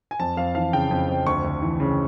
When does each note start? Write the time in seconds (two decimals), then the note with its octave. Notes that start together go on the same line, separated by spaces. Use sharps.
0.11 G#5
0.20 F2 A5
0.37 F2 F5
0.55 E3 F5
0.73 C#3 G5
0.91 F2
1.09 F2
1.26 D2 C#6
1.44 D2
1.62 E3
1.80 C#3